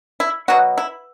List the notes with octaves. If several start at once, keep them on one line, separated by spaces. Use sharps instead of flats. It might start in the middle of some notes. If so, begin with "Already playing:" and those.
E4
B2 F#3 B3 F#4
E4